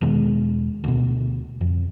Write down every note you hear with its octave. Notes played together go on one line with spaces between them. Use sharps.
E1 B2 D#3 G#3
D2 B2
F2